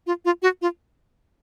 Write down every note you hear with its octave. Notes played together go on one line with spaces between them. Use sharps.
F4
F4
F#4
F4